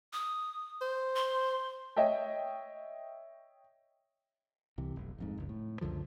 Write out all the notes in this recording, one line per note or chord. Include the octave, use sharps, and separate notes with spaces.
D#6
C5
C6
C#5 D#5 E5 G5
C2 C3 E3
F1 B1
D1 F2 G#2
F#1 C#2
A2
C#2 F#2 D3 F3